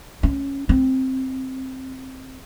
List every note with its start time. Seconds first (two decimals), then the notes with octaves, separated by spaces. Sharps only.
0.23 C#4
0.69 C4